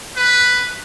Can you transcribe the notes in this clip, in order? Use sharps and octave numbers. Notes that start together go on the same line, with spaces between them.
B4